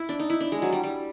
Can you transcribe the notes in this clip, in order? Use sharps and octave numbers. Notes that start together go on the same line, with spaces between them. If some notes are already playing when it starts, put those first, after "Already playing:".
Already playing: E4
D4
D#4
E4
D4
G#3
F#3
G3
G3